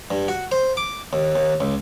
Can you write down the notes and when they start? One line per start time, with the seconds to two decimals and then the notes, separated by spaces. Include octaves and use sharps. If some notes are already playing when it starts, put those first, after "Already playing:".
0.11 G2
0.28 F#4
0.52 C5
0.77 D6
1.13 D#2
1.36 D#2
1.61 C#2